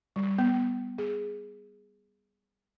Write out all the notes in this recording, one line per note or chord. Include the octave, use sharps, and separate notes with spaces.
G3
B3
G#4